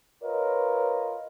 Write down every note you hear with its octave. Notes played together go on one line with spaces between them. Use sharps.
F4 A#4 B4 C#5 D#5